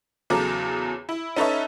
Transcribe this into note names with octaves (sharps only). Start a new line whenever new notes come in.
E2 C#3 F#3 A4 A#5 D6
E4
C#4 D#4 A4 B4 C#5 E5